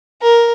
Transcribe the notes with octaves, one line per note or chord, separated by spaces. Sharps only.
A#4